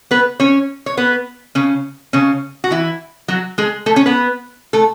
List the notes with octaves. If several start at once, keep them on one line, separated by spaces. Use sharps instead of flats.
B3 B4
C#4 C#5
C#5
B3 B4
C#3 C#4
C#3 C#4
F#4
E3 E4
F#3 F#4
G#3 G#4
A3 A4
C#4 C#5
B3 B4
A3 A4